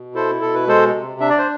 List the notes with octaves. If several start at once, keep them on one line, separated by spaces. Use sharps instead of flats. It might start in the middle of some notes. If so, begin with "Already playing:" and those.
Already playing: B2
E4 A4 C5
B2 A4
B4
G#3 A4 C5
C3
D4 E5
D5
C5